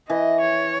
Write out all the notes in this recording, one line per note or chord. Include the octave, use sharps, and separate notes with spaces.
E3 D#5
C#5